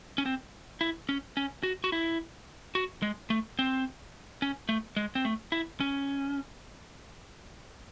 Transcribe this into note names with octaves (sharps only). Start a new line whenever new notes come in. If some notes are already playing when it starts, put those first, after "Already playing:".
C#4
C4
E4
C#4
C#4
F#4
F#4
E4
F#4
G#3
A3
C4
C#4
A3
G#3
C4
A3
E4
C#4